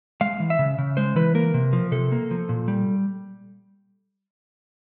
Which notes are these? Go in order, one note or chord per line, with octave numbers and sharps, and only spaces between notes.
G#3 F5
E3
E5
C#3
C#3
G#3 C5
E3 B4
A#3 A#4
C3
F3
C3 A4
A#3
F3
A#2
G3